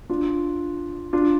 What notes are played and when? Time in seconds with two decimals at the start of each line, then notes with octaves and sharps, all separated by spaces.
0.10 D4 F4
1.13 D4 F4